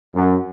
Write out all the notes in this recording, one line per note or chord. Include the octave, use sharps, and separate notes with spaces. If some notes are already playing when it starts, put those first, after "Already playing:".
F#2